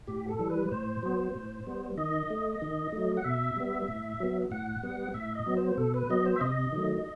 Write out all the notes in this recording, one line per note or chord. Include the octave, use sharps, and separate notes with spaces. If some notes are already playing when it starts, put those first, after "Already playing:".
A2 G4
A4
E3 G3
B4
A2 C5
F#3 B3
A2
G3 B3
D#3 D#5
A3
D#3
F#3 A3
F#5
B2 E5
G3 B3
A2
F#3 B3
A2 F#5
G3 B3
A2 E5
D#5
F#3 B3
C5
B2 A4
B4
F#3 B3 D#5
C5
E5
C3 D#5
D#3 F#3 A3